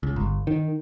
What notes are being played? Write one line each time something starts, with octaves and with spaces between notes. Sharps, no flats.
C#2
G1
D#3